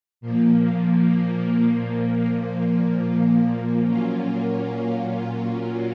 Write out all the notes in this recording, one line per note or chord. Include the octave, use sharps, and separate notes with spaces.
A#2 F3 A#3
A#2 F#3 A#3 C#4 F4